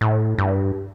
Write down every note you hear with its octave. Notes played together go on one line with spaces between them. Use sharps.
A2
G2